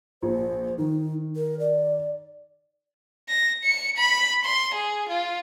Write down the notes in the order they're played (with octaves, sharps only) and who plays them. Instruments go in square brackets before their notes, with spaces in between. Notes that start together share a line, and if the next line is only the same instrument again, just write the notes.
[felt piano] A#1 F3 [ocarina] C5
[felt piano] D#3 [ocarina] D#4
[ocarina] A#4
D5
[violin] A#6
C#7
B5
C6
G#4
F4